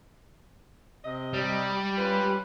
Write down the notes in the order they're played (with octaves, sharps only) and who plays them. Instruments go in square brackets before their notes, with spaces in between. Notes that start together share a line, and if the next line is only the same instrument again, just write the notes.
[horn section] C3 D#5
[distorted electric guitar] G3
[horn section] C#4 F4 B4